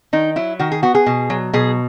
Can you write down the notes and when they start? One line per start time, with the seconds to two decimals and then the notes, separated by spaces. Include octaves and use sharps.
0.13 D#3 D#4
0.36 F#3 E4
0.59 D#3 F#4
0.72 G#4
0.83 B3 F#4
0.95 G#4
1.07 B2
1.30 F#3
1.53 B2 G#4